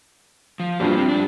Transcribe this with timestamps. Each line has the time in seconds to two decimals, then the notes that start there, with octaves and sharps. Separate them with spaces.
0.60 F3
0.80 G2 F3 G3 A#3 F#4 C5
0.97 C4 G4 C5
1.09 G#2 D4